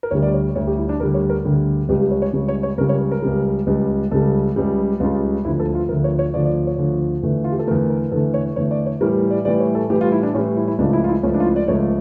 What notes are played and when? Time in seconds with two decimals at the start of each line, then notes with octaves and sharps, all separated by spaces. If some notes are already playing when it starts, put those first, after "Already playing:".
0.03 A#4
0.11 D2 D3 G3 C#5
0.22 D5
0.34 C#5
0.55 D2 D3 G3 C#5
0.67 G4
0.78 E4
0.89 D4
1.00 D2 D3 G3 A#4
1.14 C#5
1.30 A#4
1.44 D2 D3 G3
1.89 C#2 C#3 G3 G4
2.00 G4
2.11 C#5
2.22 C#5
2.33 C#2 C#3 G3
2.48 C#5
2.63 C#5
2.78 C#2 C#3 G3 A#4
2.89 C#5
3.11 A#4
3.22 C#2 C#3 G3
3.67 C#2 C#3 G3
4.11 C#2 C#3 G3 A4
4.56 C#2 C#3 G3
5.00 C#2 C#3 G3 F4
5.45 D2 D3 F3 E4
5.60 A4
5.75 F4
5.89 D2 D3 F3 A#4
6.04 C#5
6.19 C#5
6.34 D2 D3 F3 D5
6.45 D5
6.67 C#5
6.78 D2 D3 F3
7.23 E2 D3 A3
7.44 F4
7.52 G4
7.59 A4
7.67 E2 D3 A3 A#4
7.90 A#4
8.12 E2 D3 A3 A4
8.34 C#5
8.56 E2 D3 A3 C#5
8.71 D5
8.86 C#5
9.01 A2 E3 G3 A#4
9.30 D5
9.45 A2 E3 G3 D5
9.60 C#5
9.75 A4
9.90 A2 E3 G3 G4
10.01 F4
10.12 E4
10.23 D4
10.35 A2 E3 G3 C#4
10.56 E4
10.68 E4
10.79 C#2 C#3 F3 A3 D4
10.93 E4
11.04 F4
11.09 E4
11.23 C#2 C#3 F3 A3 C#4
11.34 D4
11.40 F4
11.45 E4
11.56 D5
11.68 C#2 C#3 F3 A3 C#5